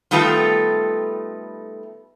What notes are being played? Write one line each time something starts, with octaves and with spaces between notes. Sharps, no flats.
D#3 G3 A3 B3 F4 A4